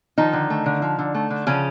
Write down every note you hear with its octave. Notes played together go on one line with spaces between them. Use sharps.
D#3 F3 D#4
D3
A3
D3
F3
D3
A3
D3
C#3 F3 C#4